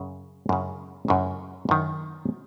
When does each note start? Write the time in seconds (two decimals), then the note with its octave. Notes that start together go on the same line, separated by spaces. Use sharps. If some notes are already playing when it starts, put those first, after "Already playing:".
Already playing: F#2 C#3
0.49 F#2 C#3
1.08 F#2 C#3
1.69 F#2 D#3